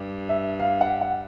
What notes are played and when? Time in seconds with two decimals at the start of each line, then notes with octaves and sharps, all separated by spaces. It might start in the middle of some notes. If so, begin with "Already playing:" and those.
Already playing: G2
0.29 E5
0.60 F5
0.81 F#5
1.01 F#5